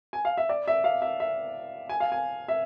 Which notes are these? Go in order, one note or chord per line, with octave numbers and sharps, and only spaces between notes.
G#5
F5
E5
D5
E5
F5
E5
E5
G#5
F5
G#5
E5